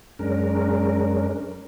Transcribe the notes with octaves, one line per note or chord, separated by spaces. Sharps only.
F#2 G#3 C#4 D4 A#4